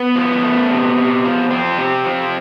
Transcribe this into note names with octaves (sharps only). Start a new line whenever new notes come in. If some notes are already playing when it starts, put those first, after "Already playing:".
Already playing: B3
F3
A3
C3
C3
F3
F3 C4
C3
F3